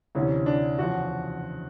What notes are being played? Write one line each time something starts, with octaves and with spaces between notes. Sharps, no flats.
D2 C3 E3 C#4
D4
E2 C#3 F3 F#4